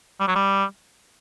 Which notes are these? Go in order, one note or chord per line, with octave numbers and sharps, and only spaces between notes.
G3
F#3
G3